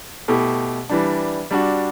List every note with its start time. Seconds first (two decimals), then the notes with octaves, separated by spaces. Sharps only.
0.28 B2 A3 E4 G4
0.90 E3 G3 D4
1.51 G3 D4 F#4